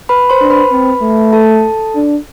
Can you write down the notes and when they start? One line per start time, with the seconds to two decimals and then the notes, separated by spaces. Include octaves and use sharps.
0.09 B4 B5
0.30 C5 C6
0.41 D4
0.50 B4 B5
0.71 C4
1.02 A3
1.33 A4 A5
1.95 D4